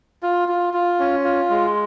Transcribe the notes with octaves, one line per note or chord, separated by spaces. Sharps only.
F4
F4
F4
C#4
F4
G#3